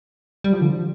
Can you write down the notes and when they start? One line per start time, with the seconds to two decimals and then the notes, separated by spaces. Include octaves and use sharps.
0.44 G3
0.53 F3
0.61 D3
0.70 F3